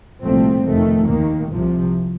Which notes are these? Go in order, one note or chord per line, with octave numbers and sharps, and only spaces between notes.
C2 A#2 F3 A3 C4
F1 F2 D#3 A3
D#2 D#3 A#3
C2 C3 F3